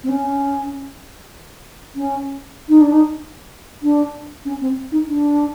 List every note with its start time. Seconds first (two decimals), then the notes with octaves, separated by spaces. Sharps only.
0.04 C4
0.09 C#4
1.96 C#4
2.69 D#4
2.81 D4
2.92 D#4
3.83 D4
4.45 C#4
4.61 C4
4.92 D#4
5.07 D4